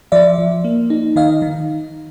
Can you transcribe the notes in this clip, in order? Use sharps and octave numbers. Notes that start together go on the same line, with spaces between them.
F3 D5 E5
F3
A#3
D#4
D#3 D#5 F5
D#3